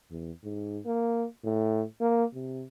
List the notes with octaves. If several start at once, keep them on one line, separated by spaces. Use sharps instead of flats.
E2
G#2
A#3
A2
A#3
C3